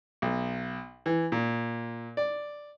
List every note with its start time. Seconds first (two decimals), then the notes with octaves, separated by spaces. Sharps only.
0.22 B1
1.06 E3
1.32 A#2
2.17 D5